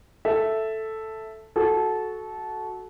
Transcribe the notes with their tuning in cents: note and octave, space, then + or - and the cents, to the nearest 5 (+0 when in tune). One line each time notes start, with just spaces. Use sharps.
A4 +0 E5 +0
F#4 +0 A4 -20